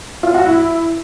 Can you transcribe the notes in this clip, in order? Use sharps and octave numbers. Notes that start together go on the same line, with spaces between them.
F4
F#4
E4